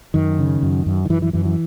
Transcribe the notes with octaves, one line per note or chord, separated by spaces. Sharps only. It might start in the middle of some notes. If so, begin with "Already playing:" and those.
F#2 D#3
C#3
F#2
F#2
D#3
F#2 E3
E3
F#2 E3
E3